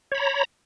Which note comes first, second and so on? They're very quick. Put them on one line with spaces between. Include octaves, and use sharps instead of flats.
C#5 B5 A#5